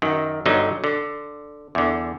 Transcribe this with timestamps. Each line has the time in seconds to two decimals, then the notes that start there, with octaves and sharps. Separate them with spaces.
0.02 F#2 D#3
0.46 G1 D3 F#3 D#4
0.84 D3
1.75 E2 D3